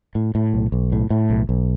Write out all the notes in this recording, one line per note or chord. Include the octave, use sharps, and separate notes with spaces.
A2
A2
B1
B1
A2
A2
B1
B1